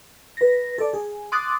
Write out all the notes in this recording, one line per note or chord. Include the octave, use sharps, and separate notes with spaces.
B4 A#6
A4 D5
G#4
C6 D6 D#6 F#6 A6